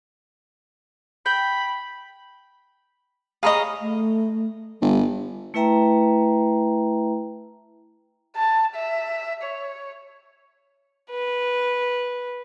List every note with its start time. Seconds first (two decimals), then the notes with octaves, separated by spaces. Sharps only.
1.26 G5 B5
3.43 G#4 C#5 D#5 F5 A#5 B5
3.81 A3
4.81 G1 G3
5.54 A3 E4 B4 E5 G5 A#5
8.36 A5
8.76 E5
9.43 C#5
11.11 B4